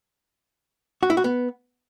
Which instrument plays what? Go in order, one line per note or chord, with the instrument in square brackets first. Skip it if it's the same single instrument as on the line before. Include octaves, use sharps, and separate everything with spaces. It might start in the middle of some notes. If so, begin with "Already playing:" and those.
[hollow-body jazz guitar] F#4
E4
F#4
B3